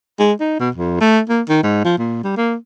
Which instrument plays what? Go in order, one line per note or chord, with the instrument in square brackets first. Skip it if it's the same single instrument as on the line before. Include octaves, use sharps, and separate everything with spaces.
[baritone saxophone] G#3
D#4
B2
F2
A3
A#3
D#3
G#2
F3
A#2
G3
A#3